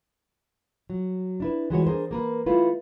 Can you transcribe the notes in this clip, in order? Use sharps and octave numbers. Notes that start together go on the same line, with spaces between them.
F#3
D4 E4 B4
E3 G#3 F#4 C#5
D4 G#4 A#4 C5
A#3 A#4 B4
A3 E4 F4 B4